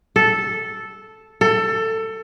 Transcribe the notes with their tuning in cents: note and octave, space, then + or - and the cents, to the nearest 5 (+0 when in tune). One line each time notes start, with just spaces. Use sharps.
A4 -5
A4 +20